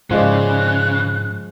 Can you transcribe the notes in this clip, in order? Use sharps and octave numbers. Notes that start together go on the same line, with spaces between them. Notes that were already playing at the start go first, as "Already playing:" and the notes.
G#2 C#3 F3 G#3 D5 F#6